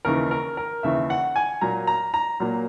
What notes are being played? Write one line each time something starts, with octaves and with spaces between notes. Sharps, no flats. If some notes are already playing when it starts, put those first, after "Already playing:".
D#2 C#3 E3 A#4
A#4
A#4
D#2 C#3 E3 E5
F#5
G#5
A#2 F#3 A#3 A#5
A#5
A#5
A#2 F#3 A#3